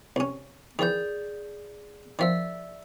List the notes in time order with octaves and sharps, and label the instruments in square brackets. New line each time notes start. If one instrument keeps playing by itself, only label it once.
[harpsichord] C2 C#4
[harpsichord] D#3 E3 [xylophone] G#4 D5 G6
[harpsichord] D#3 F3 [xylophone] D5 E5 E6